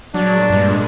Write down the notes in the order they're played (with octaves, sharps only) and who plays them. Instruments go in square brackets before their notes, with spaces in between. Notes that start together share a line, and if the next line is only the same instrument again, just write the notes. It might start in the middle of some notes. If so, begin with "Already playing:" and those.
[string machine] A#2 G#3 [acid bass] F#3 [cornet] D4
[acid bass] G2